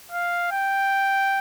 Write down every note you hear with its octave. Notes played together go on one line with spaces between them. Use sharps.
F5
G5